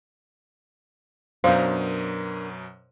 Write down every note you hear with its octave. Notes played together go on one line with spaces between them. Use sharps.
F#2 B2 F#3 D4 A#4 C5 F5